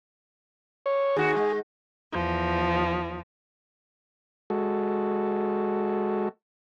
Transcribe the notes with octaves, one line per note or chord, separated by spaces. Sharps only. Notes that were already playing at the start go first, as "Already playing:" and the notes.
C#5
D#2 F#4 G#4
G#3
E2 F3
G#3 F#4 A4